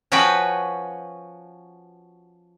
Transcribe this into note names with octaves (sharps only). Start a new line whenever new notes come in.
F3 C#4 F#4 B4 G5